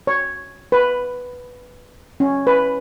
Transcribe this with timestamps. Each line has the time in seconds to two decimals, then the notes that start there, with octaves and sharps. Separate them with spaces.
0.07 C#5
0.72 B4
2.20 C#4
2.47 B4